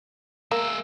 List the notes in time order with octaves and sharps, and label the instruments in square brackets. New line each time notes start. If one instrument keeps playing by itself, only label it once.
[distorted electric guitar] G#3 E5 [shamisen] A#3